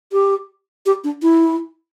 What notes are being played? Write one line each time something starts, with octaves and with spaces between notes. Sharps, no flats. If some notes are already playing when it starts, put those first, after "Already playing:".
G4
G4
D4
E4